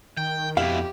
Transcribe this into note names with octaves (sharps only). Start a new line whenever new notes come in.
D#3 G5
F2 B2 E4 G4 F5